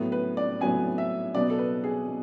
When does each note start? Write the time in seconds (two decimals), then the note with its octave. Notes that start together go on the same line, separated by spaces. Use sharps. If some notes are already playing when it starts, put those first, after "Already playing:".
Already playing: A2 F#3 B3
0.12 B4
0.37 D5
0.61 A2 F#3 B3 G#5
0.98 E5
1.35 B2 F#3 B3 D5
1.50 A4
1.59 B4
1.84 G#4
2.08 B2